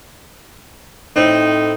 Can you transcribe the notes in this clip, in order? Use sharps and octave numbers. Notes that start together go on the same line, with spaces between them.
A2 C4 D#4